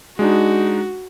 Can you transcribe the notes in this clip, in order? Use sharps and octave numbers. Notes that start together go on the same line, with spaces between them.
G#3 D4 D#4 F#4